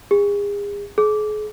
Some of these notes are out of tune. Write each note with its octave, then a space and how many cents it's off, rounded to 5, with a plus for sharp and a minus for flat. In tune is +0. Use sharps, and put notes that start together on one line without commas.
G#4 -35
G#4 +40